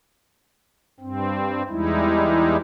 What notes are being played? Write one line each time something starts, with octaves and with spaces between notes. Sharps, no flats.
G2 C4
E2 G3 G#3 D#4 E4